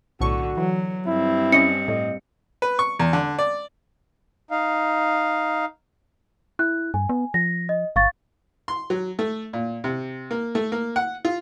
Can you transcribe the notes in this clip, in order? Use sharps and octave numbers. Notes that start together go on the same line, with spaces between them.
B1 A2 D3 F#4 C#6
E3 F#3
G2 C4 E4
C#4 D#5 C#7
A2 D#5
B4
C#6
E2
D3
D5
D#4 F5
E4 F#6
G2 G#5
B3
F3 A#6
D#5
G1 F5 C#6 A6
C6
F#3
A3
A#2
C3
A#3
A3
A#3
F#5
F4